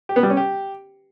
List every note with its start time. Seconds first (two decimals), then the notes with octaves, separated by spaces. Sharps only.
0.09 G4
0.16 B3
0.23 G3
0.30 C#4
0.37 G4